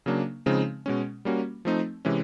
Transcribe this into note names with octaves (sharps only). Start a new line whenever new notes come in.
C#3 F#3 A#3 D4
C#3 F3 G#3 C4 D#4
B2 G#3 C#4
G3 A#3 C#4 F#4
F3 A3 C4 D#4
C3 E3 G#3 C#4